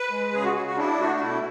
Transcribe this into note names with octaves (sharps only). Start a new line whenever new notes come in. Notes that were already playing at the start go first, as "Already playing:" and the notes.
Already playing: B4
G#3
C#3 G#4
F#4
C#3 F#4
F#4
D4 E4
A3 F#4
F#4
B2 E4